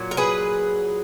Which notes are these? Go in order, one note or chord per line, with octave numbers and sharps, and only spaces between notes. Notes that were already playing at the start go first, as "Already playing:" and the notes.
Already playing: A#2 F#3
A#4
G#4 B4